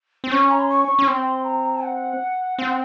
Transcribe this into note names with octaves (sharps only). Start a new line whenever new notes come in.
C4
C#4 C#6
A#5
C6
C#6
C#4
C4 C6
A#5
F#5
C4 F#5